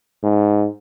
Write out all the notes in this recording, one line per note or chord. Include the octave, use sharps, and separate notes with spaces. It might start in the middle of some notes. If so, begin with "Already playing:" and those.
G#2